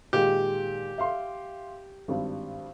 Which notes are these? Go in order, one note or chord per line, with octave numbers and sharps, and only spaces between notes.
A#2 D#3 G#3 G4
E5 F5 C6
G#1 G2